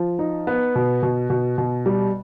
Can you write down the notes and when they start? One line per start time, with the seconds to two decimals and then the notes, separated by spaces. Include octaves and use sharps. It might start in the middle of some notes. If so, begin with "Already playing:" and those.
Already playing: F3
0.19 D#4
0.47 B3
0.75 B2
1.03 B2
1.30 B2
1.58 B2
1.86 G3